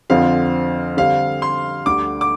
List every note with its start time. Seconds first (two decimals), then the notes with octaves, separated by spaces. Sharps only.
0.10 F2 D3 F3 C4 F5
0.97 D3 G3 C4 F5
1.42 C6
1.86 D2 D3 G3 D6
2.21 D6